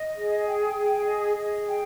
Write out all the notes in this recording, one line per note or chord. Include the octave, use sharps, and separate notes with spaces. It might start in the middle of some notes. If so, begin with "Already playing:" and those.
Already playing: D#5
G#4
G5
G#4
D#5
G#4
G5